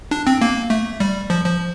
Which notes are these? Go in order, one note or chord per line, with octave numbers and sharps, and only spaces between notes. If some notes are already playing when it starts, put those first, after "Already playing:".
D4
C4
A#3
A3
G3
F3
F3